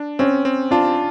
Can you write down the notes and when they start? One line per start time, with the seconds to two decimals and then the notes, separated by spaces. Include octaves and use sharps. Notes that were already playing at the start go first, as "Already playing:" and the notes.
Already playing: D4
0.19 C4 C#4
0.45 C4
0.71 D4 F4